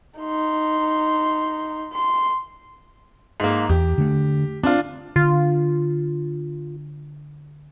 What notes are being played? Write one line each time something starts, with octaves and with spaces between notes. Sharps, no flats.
D#4 C6
C6
G#2 A#3
E2 G4
D3 A3
C4 D4 F4
D3 F4